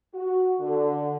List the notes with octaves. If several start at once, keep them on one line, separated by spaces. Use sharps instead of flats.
F#4
D3